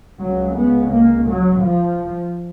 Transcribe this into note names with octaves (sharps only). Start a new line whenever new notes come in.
C#2 C#3 F#3
B3
A#3
F#3
F3